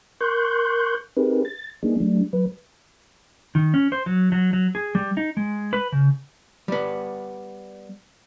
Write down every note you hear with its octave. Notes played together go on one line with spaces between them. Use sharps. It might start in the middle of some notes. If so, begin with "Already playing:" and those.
A#4 C6 C#6 F#6 G6
C4 D#4 G4 G#4 A#4 B4
A6
G3 A#3 B3 D4 D#4 G#4
F#3 G3 A3 D4
F#3 B4
D#3
C#4
C5
F#3
F#3
F#3
G#4
G3
D#4
G#3
B4
C#3
G3 B3